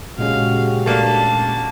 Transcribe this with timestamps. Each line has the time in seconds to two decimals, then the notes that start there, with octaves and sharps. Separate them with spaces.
0.18 A#2 C#3 G#3 C#4 F#4 G4 F5
0.86 A3 A#3 D4 A5